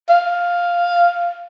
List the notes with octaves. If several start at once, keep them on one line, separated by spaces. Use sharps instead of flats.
F5